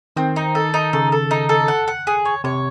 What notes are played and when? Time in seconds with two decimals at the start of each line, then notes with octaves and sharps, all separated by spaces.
0.17 D#3 C4
0.36 D#4
0.55 A4
0.74 D#4
0.93 C#3 A4
1.12 A4
1.31 D#4
1.49 A4
1.68 F#5
1.88 F#5
2.07 G#4
2.25 C#5
2.44 C3 C#5